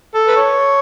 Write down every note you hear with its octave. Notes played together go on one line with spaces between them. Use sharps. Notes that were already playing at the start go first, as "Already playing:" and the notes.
A4
B4
C#5